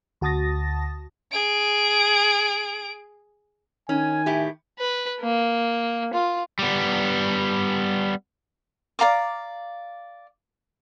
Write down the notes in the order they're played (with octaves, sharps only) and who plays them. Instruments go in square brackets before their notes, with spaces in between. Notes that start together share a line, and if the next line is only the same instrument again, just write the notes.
[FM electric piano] D2 F#4 A5 D#6 A6 A#6
[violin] G#4 D7
[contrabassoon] D#3 [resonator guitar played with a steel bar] C#4 [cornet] G#5
[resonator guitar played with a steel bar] A2 E4 G4
[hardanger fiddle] B4
A#3
F4
[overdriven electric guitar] G3 B3
[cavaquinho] D5 F5 A#5 D6